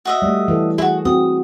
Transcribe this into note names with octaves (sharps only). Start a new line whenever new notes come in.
F#4 D#5 E5
G3 A3
E3 A4
E4 F#4 G#4
C4 F#4 D#6